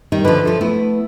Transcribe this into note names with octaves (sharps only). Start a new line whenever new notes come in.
D#3 G3 D#4
D3 F3 B4
C3 F3 A4
A3 B3 E4